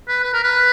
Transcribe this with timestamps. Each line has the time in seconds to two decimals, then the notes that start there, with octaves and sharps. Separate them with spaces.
0.08 B4
0.23 B4
0.33 A#4
0.44 B4